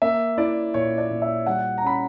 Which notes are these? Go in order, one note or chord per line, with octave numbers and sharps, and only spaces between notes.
A#3 E5
E4 D5
A#2 C#5
D5
A#2
E5
G3 F#5
A#5
C#4 B5